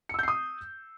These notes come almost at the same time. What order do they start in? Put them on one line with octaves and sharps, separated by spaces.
C#7 E6 G6 C7 D#6